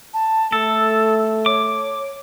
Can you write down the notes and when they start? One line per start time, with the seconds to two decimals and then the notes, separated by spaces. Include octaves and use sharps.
0.14 A5
0.52 A3 A4 E6
1.46 C#5 D6